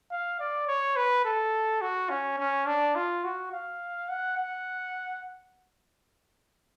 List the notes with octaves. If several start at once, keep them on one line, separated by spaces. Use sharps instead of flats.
F5
D5
C#5
B4
A4
F#4
C#4
C#4
D4
F4
F#4
F5
F#5
F#5